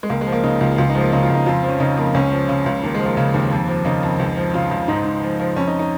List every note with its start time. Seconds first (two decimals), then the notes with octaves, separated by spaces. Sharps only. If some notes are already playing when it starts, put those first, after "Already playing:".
0.03 G#3
0.10 C#2 A#3
0.21 G#3
0.27 F3
0.32 A#3
0.43 C#3 D#4
0.61 C#2 F4
0.78 C#2 F4
0.89 D#4
0.95 F3 G#3
1.01 A#3
1.12 C#3 D#4
1.23 F4
1.29 C#2
1.35 D#4
1.46 F2 F4
1.63 F3
1.69 C#4
1.80 C#3 D#4
1.97 F2 A#3
2.14 C#2 C#4
2.32 F3
2.49 C#3
2.66 C#2
2.83 D#2 A#3
2.95 G#3
3.00 F3
3.06 A#3
3.17 C#3
3.34 D#2
3.51 F2
3.68 F3
3.85 C#3 D#4
4.03 F2
4.19 C#2
4.37 F3
4.54 C#3 F4
4.71 C#2
4.88 G#2 D#4
5.05 G#2
5.22 F3
5.39 F3
5.56 F2 C#4
5.68 D#4
5.79 D#4